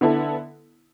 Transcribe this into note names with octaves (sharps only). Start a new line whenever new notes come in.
D3 B3 E4 A4